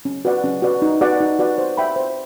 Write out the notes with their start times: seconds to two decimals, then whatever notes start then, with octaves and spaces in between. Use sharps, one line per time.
0.05 C#4
0.25 F#4 B4 D5 F#5
0.44 C#4
0.62 F#4 B4 D5 F#5
0.82 D#4
1.01 F#4 B4 D5 F#5
1.20 D#4
1.39 F#4 B4 D5 F#5
1.58 C5
1.77 E5 G5 B5
1.96 C5